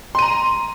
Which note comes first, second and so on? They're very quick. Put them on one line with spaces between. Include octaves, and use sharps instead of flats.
C6 D#7 A#5